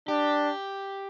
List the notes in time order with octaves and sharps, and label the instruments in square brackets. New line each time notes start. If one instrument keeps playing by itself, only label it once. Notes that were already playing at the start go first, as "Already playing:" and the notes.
[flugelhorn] D4 [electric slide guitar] G4